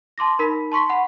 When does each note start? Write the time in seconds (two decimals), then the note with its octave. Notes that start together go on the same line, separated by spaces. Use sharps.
0.18 A5 C6 D6 A#6
0.39 D#4 A#4 B5 B6
0.72 A5 C6 C#6 B6
0.89 F#5 B5